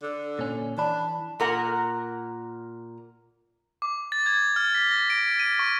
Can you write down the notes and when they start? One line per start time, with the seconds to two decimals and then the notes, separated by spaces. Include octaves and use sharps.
0.02 D3
0.39 A#2 C#4
0.78 E3 D4 A5 B5
1.40 A#2 A#4 F#5
3.82 D6
4.12 A6
4.26 G#6
4.56 F6
4.75 B6
4.91 A#6
5.10 D7
5.39 D#7
5.59 C#6